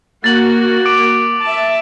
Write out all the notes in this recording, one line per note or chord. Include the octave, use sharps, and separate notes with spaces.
A#3 F#4 F#5 A6 F#7
D6 D7
E5 A5